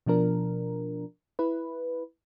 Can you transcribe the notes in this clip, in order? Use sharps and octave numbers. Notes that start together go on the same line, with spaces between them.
B2 F3 D4 A#4
E4 B4